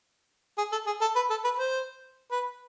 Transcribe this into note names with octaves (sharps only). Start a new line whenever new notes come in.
G#4
A4
G#4
A4
B4
A4
B4
C5
B4